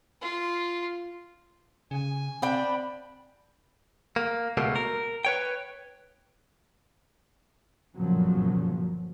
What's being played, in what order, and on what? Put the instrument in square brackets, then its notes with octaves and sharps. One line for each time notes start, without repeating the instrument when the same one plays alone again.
[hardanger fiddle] F4
[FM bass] C#3 [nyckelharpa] G#5
[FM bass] C4 [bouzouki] D4 G5 [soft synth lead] B5
[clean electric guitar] A#3
C#2 B2 A3 A#3
A#4
B4 C#5 G5
[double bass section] G1 F#2 A#2 C#3 F3 F#3